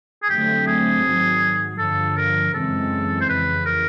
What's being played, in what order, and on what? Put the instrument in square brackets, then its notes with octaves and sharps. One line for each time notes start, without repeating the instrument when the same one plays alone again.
[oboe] G#4
[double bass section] D3 F#3 A3 C4 [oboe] G4
[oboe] G#4
[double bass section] G#2 D#3 F#3
[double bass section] G2 D3 F3 [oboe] A4
[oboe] A#4
[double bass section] F#2 C#3 E3 G#3 C4 [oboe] A4
[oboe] C5
[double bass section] F2 C#3 E3 [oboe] B4
[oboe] A#4